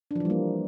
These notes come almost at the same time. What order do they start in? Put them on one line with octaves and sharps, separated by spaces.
D4 F3 E3 G3 A#3